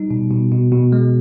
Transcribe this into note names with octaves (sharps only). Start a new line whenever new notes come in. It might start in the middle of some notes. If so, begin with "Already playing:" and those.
Already playing: G3 D#4
B2
B2
B2
B2
G#3